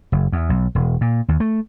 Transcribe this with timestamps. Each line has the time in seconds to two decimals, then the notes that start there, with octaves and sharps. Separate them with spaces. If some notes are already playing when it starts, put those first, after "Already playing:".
0.12 F#1
0.32 E2
0.49 B1
0.75 E1
1.01 A#2
1.28 D#2
1.40 A3